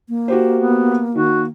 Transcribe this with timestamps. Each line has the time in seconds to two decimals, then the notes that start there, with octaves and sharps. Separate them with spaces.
0.09 A#3
0.28 F#4 G4 C5
0.57 B3
1.15 D#3 F#4